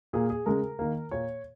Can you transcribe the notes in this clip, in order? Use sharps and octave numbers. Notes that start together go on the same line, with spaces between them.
A#2 A#3 G#4
G#4
C#3 G#3 A#4
D#3 A#3
A#2 A#3 C#5